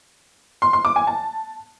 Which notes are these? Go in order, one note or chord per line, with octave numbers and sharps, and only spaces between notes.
C6
C6
D6
G#5
A5